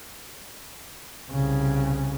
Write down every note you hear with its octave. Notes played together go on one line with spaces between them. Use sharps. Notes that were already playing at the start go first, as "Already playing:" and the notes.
C2 C#3